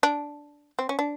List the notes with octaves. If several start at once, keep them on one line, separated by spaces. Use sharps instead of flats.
D4
C4
C#4
D4